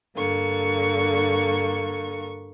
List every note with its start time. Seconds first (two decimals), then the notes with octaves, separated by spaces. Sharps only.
0.15 G2 D3 A#3 C#6